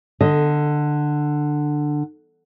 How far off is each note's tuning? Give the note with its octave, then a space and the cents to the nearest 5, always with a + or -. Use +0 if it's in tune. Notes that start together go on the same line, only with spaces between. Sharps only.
D3 +15 D#5 +0